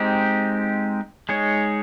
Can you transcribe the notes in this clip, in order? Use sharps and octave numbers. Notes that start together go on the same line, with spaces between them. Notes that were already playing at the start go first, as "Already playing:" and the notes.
Already playing: G#3 C4 D#4 G4
G#3 D#4 G#4 C#5